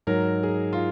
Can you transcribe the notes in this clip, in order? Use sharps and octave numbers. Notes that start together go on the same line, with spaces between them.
G#2 F#3 A#4
G#4
F4